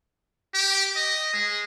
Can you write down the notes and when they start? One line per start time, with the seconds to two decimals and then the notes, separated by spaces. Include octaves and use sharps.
0.54 G4
0.96 D#5
1.33 G#3